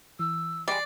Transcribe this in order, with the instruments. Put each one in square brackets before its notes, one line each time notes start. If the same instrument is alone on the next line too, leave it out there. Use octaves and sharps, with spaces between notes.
[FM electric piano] E3 [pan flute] E6
[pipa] G3 G#3 [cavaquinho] D5 [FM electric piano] C7